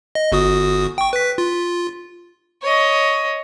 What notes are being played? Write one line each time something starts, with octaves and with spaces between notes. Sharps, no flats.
D#5
G1 F#4 D#6
G5 C#6
B4 B6
F4
C#5 D#5